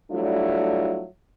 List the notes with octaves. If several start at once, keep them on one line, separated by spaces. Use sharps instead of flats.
F#3 G3 A3 D4 E4 F4